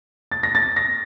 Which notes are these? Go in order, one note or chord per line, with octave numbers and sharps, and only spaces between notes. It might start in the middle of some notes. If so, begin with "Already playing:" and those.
A6
A#6
A6
A#6